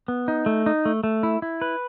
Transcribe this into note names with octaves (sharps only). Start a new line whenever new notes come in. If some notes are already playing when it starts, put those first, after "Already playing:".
B3
D#4
A3
D#4
A3
A3
E4
E4
B4